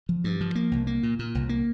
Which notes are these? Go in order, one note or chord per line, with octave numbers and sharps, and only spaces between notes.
F3
G2
F3
A#3
C2
A#3
A#2
A#2
C2
A#3